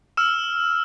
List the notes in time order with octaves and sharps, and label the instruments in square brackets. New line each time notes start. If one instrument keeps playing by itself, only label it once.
[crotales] E6 F6 E7